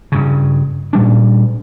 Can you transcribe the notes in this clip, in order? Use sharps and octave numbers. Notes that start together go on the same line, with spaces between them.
G2 C#3
A#2 G3 D4